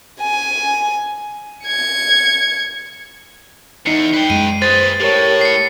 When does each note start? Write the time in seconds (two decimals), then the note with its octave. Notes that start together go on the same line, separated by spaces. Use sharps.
0.21 G#5
1.65 G#6 C#7
3.86 E2 D#4 C7 C#7
4.14 B4 G5
4.30 F#2 G#3 D#7
4.62 G#4 B4 C5 A6
5.00 A2 G4 A#4 C#5
5.41 C7 C#7